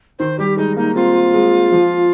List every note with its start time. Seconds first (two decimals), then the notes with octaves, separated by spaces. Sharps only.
0.19 D#3 C5
0.39 G3 G4
0.57 G#3 D#4
0.76 A#3 D#4
0.95 C4 F4
1.34 G#3
1.72 F3